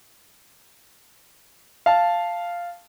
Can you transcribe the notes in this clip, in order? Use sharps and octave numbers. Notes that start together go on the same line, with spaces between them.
F5 A5